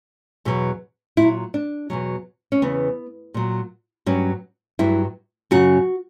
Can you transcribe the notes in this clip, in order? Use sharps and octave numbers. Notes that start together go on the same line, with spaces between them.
E2 B2 F#3
A#2 F#3 E4
D4
E2 B2 F#3
C#4
E2 C#3 E3 B3
A#2 F#3
G2 F#3 C#4
G2 F#3 E4
F#2 C#3 F#3 F#4